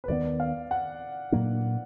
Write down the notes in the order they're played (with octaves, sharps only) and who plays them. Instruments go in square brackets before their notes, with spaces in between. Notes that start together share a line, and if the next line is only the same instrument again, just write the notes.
[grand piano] B4
[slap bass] D#2 D#3 G#3 B3 [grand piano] D5
[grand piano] F5
F#5
[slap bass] A#2 F#3 A#3 D4